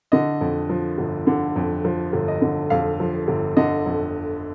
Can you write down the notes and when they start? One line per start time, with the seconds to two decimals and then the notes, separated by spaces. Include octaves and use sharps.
0.12 D3 D#5
0.41 F2
0.69 F3
0.98 G1
1.27 D3
1.56 F2
1.85 F3
2.13 G1
2.28 D#5
2.42 D3
2.70 F2 F5
3.00 F3
3.28 G1
3.57 D3 D#5
3.86 F2